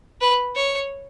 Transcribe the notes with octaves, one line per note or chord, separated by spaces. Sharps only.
B4
C#5